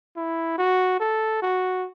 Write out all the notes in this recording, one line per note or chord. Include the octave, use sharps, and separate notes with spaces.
E4
F#4
A4
F#4